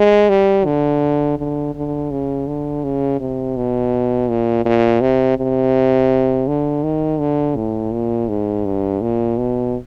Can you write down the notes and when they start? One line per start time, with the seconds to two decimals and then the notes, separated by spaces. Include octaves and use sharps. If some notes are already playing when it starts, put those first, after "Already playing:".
Already playing: G#3
0.30 G3
0.66 D3
1.38 D3
1.75 D3
2.11 C#3
2.48 D3
2.84 C#3
3.20 C3
3.56 B2
4.29 A#2
4.65 A#2
5.01 C3
5.38 C3
6.47 D3
6.84 D#3
7.19 D3
7.56 A2
7.92 A#2
8.29 G#2
8.65 G2
9.01 A#2
9.38 B2